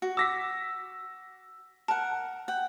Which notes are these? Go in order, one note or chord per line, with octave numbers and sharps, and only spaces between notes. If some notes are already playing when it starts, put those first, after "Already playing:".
F#4
D6 E6 A#6 B6
A#4 F#5 A5
F#5 G5